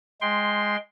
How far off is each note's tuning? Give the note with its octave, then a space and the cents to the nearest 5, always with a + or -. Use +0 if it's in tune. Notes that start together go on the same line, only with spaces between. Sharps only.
G#3 +0 G5 +0 C6 +0